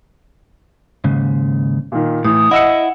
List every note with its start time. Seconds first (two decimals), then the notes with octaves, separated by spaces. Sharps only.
1.04 D#2 G#2 C#3
1.92 A#2 D#3
2.25 A2 E3 D#6
2.51 E4 D#5 F#5 E6 C#7